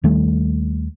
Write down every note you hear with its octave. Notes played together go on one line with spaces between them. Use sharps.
D#2 D#3 G3 A3